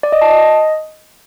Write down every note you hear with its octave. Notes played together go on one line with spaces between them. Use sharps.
D5
D#5
A5
D#5